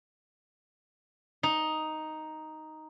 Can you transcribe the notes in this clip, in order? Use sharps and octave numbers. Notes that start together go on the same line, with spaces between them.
D#4